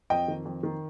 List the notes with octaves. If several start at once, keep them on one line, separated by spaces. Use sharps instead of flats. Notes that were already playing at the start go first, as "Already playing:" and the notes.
F2 D#5 G5
D#3
F2
D#3